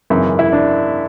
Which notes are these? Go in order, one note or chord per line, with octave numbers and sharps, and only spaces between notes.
G#1 F#2 C#3 E3
E4
D4